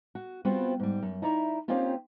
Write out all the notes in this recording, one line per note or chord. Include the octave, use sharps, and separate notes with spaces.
F#4
G3 B3 C4 F4 F#4 C5
G#2 G3
F#2
D#4 E4 D5 E5 A#5
A#3 C4 C#4 D#4 F4 G4